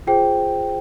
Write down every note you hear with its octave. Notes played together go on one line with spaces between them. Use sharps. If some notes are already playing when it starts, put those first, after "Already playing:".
F4 G#4 C5 G5